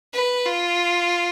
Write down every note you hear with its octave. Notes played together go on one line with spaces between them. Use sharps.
B4
F4